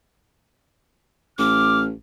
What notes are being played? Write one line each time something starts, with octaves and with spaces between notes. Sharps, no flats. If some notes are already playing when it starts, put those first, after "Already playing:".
A1 D6 F6